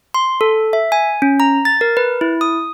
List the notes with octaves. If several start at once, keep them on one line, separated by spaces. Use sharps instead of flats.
C6
A4
E5
G#5
C#4
A#5
A6
A#4
B4
E4
D#6